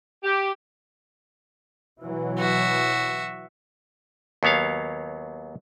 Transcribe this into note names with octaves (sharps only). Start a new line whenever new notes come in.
G4
B2 E3 F#3
F#4 E5
D#2 F#3 B3 C#5 F5